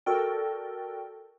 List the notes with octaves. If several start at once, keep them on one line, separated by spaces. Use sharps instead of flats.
F#4 A4 A#4 D5 G5